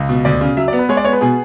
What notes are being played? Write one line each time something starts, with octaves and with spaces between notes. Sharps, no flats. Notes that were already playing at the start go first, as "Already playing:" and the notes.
Already playing: C#2
B2
D2 D5
C#3
F#3 E5
D5
B3
B4
G#3 C#5
D5
B3 C#5
B4
B2 G#4